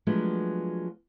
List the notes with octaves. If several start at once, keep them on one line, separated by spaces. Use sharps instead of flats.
F3 F#3 G#3 A3 B3 D4